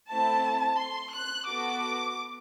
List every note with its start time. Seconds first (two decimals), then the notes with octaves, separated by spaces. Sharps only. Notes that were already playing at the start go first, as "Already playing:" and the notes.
0.10 A3 C4 E4 A5
0.77 C6
1.12 F#6
1.45 B3 F#4 A4 D6